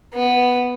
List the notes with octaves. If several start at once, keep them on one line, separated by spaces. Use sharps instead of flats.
B3